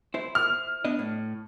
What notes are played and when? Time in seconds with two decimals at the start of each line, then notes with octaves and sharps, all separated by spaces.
0.14 E4 C5
0.35 F6
0.85 B3 D4 D#5
0.99 A2